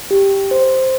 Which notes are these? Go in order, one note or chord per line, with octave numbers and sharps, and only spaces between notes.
G4
C5